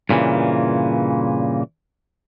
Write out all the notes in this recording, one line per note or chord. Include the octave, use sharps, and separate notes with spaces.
G2 A#2 C#3 E3